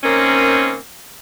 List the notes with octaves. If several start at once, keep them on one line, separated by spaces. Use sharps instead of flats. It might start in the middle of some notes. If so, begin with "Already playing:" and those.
D#3 A#3 C4 C#4